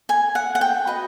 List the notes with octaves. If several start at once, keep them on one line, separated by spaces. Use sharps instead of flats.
G#5
F#5
F#5
G5
F#4 B4 D#5